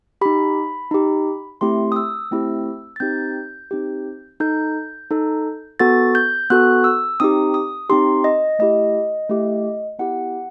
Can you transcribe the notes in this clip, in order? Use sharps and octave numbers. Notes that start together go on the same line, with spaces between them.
D#4 G4 B5
D#4 G4
A3 C4 E4 G4 C6
D#6
E6
A3 C4 E4 G4
A6
C4 D#4 G4 G6
C4 D#4 G4
D#4 A4 G6
D#4 A4
B3 F#4 A4 A6
G6
B3 F#4 A4 F#6
E6
C4 D#4 G4 D#6
D#6
C4 D#4 G4 C6
D#5
A3 E4 G4 D#5
A3 E4 G4
B3 E4 G4 F#5